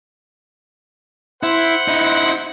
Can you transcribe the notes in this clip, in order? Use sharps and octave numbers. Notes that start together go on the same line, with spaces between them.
E4 C5 F#5
D#4 E4